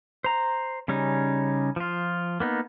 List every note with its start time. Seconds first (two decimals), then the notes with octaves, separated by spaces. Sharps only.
0.24 C5 A#5
0.88 C#3 G3 C#4 D#4
1.76 F3 F4
2.40 A#3 B3 D#4